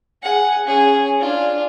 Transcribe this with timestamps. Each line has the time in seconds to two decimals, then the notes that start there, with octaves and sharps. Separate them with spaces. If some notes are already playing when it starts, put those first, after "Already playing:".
0.23 G#4 F#5
0.66 C#4 G#4
1.20 D4 F4